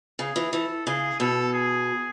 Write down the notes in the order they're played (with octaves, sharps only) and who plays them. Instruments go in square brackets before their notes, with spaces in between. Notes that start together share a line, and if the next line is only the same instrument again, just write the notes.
[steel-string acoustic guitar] C#3 [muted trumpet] G#4
[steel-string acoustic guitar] E3
[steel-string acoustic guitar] E3 [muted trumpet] A4
[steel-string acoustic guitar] C#3 [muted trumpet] G#4
[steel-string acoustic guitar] B2 [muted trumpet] A4
[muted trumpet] G#4